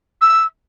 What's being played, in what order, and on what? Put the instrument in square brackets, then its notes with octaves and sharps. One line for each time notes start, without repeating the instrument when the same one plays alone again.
[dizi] E6